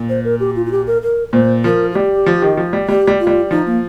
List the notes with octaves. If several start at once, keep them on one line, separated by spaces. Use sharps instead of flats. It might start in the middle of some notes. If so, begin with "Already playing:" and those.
Already playing: A#2
C5
A#4
G4
F4
F4
G4
A#4
A#4
A#2 C5
F3 A#4
F4
G3 G4
F3
D#3
F3
G3
G3 G4
G3
F4
G3
F3 D#4
A#3